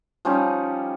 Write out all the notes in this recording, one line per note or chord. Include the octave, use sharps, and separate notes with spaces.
F3 G3 C#4 D#4